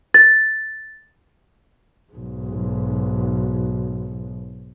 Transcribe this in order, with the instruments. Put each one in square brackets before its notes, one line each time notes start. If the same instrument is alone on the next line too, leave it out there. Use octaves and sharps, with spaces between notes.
[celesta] A6
[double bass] B1 G#2